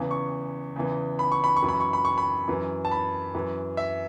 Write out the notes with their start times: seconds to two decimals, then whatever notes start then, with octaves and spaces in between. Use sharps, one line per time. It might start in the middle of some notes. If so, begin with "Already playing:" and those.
Already playing: E2 C#3 E3
0.11 C#6
0.76 E2 C#3 E3
1.19 B5
1.32 C#6
1.44 B5
1.56 C#6
1.62 F#2 E3
1.68 B5
1.80 C#6
1.93 B5
2.05 C#6
2.18 B5
2.48 F#2 E3
2.85 A5
2.91 B5
3.34 F#2 E3
3.77 E5